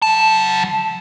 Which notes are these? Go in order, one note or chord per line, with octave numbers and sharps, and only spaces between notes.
F#3 A5